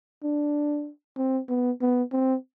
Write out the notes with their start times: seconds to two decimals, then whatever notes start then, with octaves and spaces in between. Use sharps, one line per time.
0.23 D4
1.17 C4
1.49 B3
1.81 B3
2.12 C4